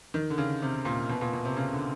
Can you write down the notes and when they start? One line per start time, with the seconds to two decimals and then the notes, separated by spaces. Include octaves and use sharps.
0.14 D#3
0.30 D3
0.38 C#3
0.62 C3
0.85 A#2
1.09 B2
1.21 A#2
1.33 B2
1.45 C3
1.57 C#3
1.73 D3